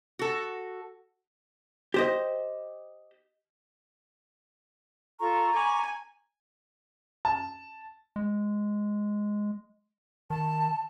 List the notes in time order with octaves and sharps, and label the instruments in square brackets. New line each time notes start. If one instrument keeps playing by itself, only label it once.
[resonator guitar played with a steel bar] F#4 A4
[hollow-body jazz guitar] G4 C5 D#5
[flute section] F4 A4 C#6 [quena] A#5
[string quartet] G#5 [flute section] B5 C#6 D6
[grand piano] A5
[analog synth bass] G#3
[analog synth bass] D#3 [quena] A5